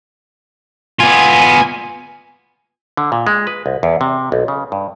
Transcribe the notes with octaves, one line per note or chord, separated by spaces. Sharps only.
B3 F4 G#5
D3
A#2
G#3
B4
C2
E2
C3
B1
C#3
G2